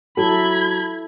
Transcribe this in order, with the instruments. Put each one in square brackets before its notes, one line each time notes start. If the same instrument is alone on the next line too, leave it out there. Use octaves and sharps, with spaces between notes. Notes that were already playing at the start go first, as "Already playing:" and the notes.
[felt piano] F#3 [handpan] E4 A4 [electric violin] B5 G#6